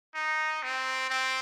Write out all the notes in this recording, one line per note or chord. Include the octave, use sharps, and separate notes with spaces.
D#4
C4
C4